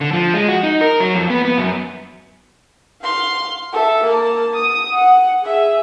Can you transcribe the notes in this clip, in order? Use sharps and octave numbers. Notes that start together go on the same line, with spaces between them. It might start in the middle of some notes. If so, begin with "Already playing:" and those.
D3
F3
G#3
F#4
D#4
A#4
F#3
F2
B3
B3
F#2
F5 C6
A4 E5
A#3 A5
D#6
F#5
G#4 E5